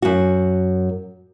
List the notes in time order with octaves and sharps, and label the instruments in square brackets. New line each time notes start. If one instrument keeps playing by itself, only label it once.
[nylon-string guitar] F#2 F#4